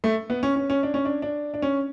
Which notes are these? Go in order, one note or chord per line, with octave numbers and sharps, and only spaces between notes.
A3
B3
C#4
C#4
C#4
D4
C#4
D4
D4
D4
C#4